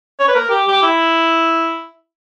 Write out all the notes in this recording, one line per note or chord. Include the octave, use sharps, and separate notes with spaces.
C#5
B4
A#4
G4
G4
E4